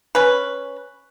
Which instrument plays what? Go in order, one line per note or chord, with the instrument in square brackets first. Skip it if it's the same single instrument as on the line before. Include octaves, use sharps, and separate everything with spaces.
[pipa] C#4 B4